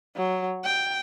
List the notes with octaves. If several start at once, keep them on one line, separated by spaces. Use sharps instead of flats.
F#3
G5